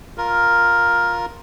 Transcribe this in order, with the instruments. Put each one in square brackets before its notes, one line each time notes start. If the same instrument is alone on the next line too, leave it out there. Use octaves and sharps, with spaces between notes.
[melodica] F4 A#4